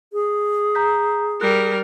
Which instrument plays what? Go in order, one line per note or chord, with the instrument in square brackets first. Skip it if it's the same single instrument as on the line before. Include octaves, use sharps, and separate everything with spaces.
[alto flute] G#4
[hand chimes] A#5 G6 B6
[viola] G3 A#4 [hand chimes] F#6